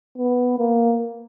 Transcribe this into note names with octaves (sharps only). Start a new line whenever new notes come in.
B3
A#3